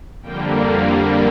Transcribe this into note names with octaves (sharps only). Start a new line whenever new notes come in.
F2 D3 G3 A#3 G5
F5